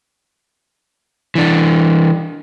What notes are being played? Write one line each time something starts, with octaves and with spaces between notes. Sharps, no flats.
E3 D4